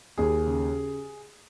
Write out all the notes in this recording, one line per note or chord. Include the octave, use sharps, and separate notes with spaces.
D#2 G#4
C#3